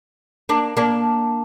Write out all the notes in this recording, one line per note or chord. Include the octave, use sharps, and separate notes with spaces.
A#3 D4
A#3 D4